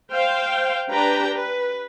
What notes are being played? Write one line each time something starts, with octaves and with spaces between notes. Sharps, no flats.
C5 F5 G5
D4 G4 B4 G5 A#5
B4